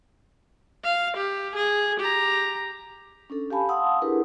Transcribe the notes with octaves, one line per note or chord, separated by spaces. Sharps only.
F5
G4
G#4
G4 A#5
C#4 D4 A4
G4 F5 G#5 A5 B5
F5 F#5 A5 C6 D#6 E6
D4 E4 G4 G#4 A#4 B4